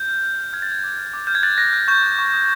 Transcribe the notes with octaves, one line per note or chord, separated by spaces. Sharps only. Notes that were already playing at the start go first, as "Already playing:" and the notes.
Already playing: G6
F6
F6
F6
F6 G#6
A6
F6 G#6
D6
F6
D6
F6 G6
G#6
F#6 A6
F#6 A#6
F#6
C#6 G6
F#6
C#6
D#6